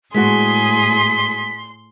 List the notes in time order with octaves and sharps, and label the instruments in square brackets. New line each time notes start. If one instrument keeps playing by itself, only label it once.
[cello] A2 G#4 [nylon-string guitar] G#3 B3 F#4 [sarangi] C6 [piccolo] B6